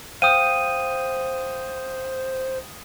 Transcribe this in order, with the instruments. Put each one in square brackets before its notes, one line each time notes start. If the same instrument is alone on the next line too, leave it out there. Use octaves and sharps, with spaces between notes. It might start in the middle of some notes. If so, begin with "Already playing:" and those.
[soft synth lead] C5 [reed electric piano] F5 G5 [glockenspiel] D#6 D#7